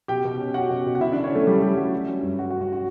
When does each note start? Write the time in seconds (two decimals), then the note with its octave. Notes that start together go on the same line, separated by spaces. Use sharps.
0.08 B2 G4 G5
0.25 B2
0.39 C#4
0.54 C#4 F#4 F#5
0.70 B2
0.86 B2
0.95 F#5
1.00 D3 E4 E5
1.12 D3 D4 D5
1.24 C#4 C#5
1.32 D3 A3 A4
1.46 D3 G3 G4
1.61 G3 C#4 G4
1.77 G3 F#4
1.93 F#3
2.07 C#4
2.23 G2
2.39 G2 F#4
2.50 F#4
2.53 C#4
2.61 F#4
2.73 F#4